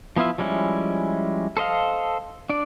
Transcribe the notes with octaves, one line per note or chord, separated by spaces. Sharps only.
F3 B3 E4 F4 E5
F3 G3 G#3 C#4 E4
A4 C5 D#5 F5
D4 D5